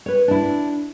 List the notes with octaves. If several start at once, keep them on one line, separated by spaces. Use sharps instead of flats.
B4 C#5
D4 E4